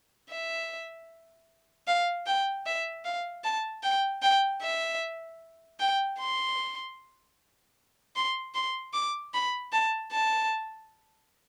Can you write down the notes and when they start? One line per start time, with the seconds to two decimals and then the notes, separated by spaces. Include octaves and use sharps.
0.30 E5
1.87 F5
2.26 G5
2.66 E5
3.05 F5
3.44 A5
3.83 G5
4.22 G5
4.62 E5
5.80 G5
6.19 C6
8.16 C6
8.54 C6
8.94 D6
9.34 B5
9.72 A5
10.12 A5